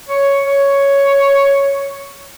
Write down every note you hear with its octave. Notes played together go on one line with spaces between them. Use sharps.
C#5
C#5